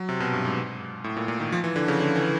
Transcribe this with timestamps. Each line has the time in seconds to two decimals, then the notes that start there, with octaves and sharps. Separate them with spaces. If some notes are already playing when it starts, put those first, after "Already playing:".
Already playing: F#3
0.09 C3
0.20 B2
0.33 G2
0.45 G#2
1.04 A2
1.17 A#2
1.28 A#2
1.40 D#3
1.52 F3
1.64 E3
1.76 D3
1.88 C#3
2.00 D3
2.16 E3